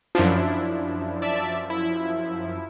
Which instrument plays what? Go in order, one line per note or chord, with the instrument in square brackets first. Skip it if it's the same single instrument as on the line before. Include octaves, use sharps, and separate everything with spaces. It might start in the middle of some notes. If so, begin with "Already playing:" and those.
[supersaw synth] F#2 F3 [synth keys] D4 E4
[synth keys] D5 E5 A5
E4